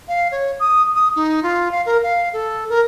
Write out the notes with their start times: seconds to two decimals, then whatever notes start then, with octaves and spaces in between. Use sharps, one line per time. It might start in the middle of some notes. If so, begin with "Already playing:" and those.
0.08 F5
0.32 C#5
0.60 D#6
0.94 D#6
1.16 D#4
1.43 F4
1.71 F5
1.86 A#4
2.03 F5
2.33 A4
2.69 A#4